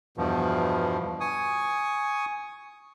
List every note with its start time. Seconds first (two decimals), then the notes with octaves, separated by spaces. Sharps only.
0.17 E2 G2 B2 F3
1.21 G#5 C#6 D#6